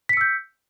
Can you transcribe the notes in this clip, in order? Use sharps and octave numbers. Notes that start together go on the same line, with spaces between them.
E6 G6 B6 C#7